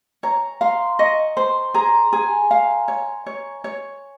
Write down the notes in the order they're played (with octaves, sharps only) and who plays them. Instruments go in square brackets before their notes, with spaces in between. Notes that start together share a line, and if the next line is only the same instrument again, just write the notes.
[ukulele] C#5 [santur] A#5
[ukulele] F5 [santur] C6
[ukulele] D#5 [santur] C#6
[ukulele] C5 [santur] C6
[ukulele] G#4 [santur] A#5
[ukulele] G#4 [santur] G#5
[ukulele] F5
C#5
C#5
C#5